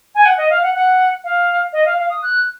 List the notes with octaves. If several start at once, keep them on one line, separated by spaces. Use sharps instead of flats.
G#5
F#5
D#5
F5
F#5
F#5
F5
D#5
F5
F5
D#6
F#6